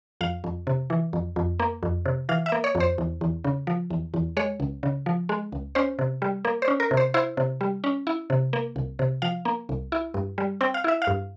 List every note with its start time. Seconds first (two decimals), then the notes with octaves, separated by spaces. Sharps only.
0.21 F2 F5
0.44 F2
0.67 C3
0.90 E3
1.13 F2
1.36 F2
1.60 A#3
1.83 F2
2.05 C3
2.29 E3 F5
2.46 E5
2.52 A#3
2.64 C#5
2.75 F2
2.80 C5
2.98 E2
3.21 E2
3.44 C#3
3.67 F3
3.90 E2
4.14 E2
4.37 G#3 C#5
4.60 C#2
4.83 C#3
5.06 F3
5.29 G#3
5.52 C#2
5.75 C#4 C5
5.99 C3
6.22 G3
6.45 A#3
6.62 C5
6.68 C#4
6.80 A#4
6.91 C3
6.97 C5
7.14 E4 C5
7.37 C3
7.61 G3
7.84 C#4
8.07 E4
8.30 C3
8.53 A#3
8.76 C2
8.99 C3
9.22 F3 F5
9.45 A#3
9.69 C2
9.92 E4
10.14 G2
10.38 G3
10.61 C4 G5
10.74 F5
10.84 E4 E5
11.02 F5
11.07 G2